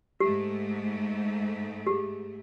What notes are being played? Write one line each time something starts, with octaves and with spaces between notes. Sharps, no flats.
G#2 A3 G4
G4 G#4